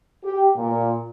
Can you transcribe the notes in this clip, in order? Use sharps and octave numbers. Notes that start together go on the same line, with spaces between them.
G4
A#2